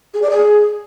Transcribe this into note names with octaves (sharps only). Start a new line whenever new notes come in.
G#4
D5
G#4